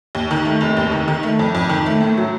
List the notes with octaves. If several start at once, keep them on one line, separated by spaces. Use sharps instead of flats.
D#2
D#3
A3
F1
D#2
D#3
D#3
A3
F2
F2
D#3
A3
A2
F#3